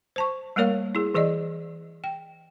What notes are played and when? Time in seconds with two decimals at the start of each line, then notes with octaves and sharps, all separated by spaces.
0.16 C5 A5 C#6
0.56 G3 A3 A#3 A#4 C#5 F5
0.95 E4 G#4
1.14 E3 G#4 D5 D#5
2.04 G5